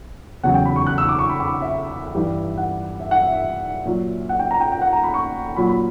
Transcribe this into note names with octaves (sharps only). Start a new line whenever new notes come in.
E2 C#3 F#3 F#5
G5
B5
C#6
F#6
E6
D6
C#6
B5
B5
E5
G2 E3 G3
F#5
E5
F#5
E5
E5
A#2 F#3
F#5
G5
A#5
G5
G5
F#5
A#5
B5
C#6
A#2 F#3 B5
B5